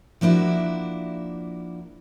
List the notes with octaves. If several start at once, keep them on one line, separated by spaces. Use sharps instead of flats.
F3 A#3 D4 E4 F#4